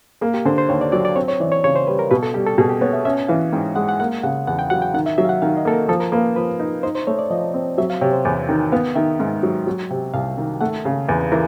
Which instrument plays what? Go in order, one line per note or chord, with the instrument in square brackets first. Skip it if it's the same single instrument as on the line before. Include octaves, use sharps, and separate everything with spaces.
[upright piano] A#3 [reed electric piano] G#4
[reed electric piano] G4
[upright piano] D3 [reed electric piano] C5
[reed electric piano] C5
[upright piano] D#2 [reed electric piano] C#5
[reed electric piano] D5
[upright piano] F#3 [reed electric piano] D5
[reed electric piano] D5
[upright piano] C4 [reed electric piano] C#5
[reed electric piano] C#5
[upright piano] E3 [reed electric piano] D5
[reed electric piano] C#5
[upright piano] C#3 [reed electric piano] C#5
[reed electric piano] C5
[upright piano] G3 [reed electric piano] B4
[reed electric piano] A#4
[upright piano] B2 [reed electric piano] B4
[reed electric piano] A4
[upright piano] G3 [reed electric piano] G4
[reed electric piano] A4
[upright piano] B2 [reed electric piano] G#4
[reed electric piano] G4
[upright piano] B3 [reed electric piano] C#5
[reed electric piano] E5
[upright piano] C#4 [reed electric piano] E5
[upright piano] E3 [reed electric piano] F5
[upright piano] G#2 [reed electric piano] G5
[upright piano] G#3 [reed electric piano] F#5
[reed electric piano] F#5
[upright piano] A#3 [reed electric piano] F#5
[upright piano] C#3 [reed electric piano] F#5
[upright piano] E2 [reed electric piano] F#5
[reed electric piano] G5
[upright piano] F#3 [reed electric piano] F#5
[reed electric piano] G5
[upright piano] D#3 [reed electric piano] F#5
[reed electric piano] E5
[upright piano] F#3 [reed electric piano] E5
[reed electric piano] F5
F#5
[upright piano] D#3 [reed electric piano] F5
[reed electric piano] D#5
[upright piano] A#3 [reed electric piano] A4
[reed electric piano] A#4
[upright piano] F3 [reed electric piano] A4
[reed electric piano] A#4
[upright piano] A#3 [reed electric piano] B4
[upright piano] F3 [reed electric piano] B4
[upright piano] D#4
[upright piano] D#4 [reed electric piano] C5
[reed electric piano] C5
[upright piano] A3 [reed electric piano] C#5
[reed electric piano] D5
[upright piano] F3 [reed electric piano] D#5
[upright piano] C4
[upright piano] F#3 [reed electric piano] E5
[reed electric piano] F5
[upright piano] C3 [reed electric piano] C#5
[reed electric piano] C5
[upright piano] E2
D#3
[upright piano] B3 [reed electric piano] F5
[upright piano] D#3 [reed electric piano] E5
[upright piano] G#2
F#3
F#3
C3
[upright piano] C2 [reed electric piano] F5
[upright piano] D#3
[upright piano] A3 [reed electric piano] F#5
[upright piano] C#3
[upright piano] E2 [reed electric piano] B4
[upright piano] E3 [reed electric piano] A#4